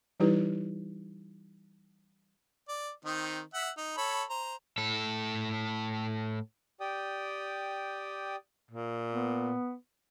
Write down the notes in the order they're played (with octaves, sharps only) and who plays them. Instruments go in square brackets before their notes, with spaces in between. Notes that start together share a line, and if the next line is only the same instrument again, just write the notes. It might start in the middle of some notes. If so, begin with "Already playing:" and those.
[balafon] E3 G3 D#4 E4 G4 B4
[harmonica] D5
D#3 C4 D#4
E5 F#5
D#4
A4 C#5 B5
C5 A#5
[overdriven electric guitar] A2 A4
[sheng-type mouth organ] G4 D5 G5 D#6
[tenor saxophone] A#2
[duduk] B3